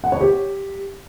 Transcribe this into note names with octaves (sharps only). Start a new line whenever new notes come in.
F#5
C#5
G4